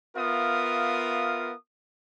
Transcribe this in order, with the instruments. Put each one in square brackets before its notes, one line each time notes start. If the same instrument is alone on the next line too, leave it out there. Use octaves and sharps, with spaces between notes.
[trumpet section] B3 F4 A#4 E5 F5 D#6